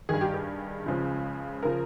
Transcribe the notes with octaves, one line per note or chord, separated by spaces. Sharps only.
G2 D#3 G#4
G4
G#4
C#2 C#3 F3
C#3 F3 A#4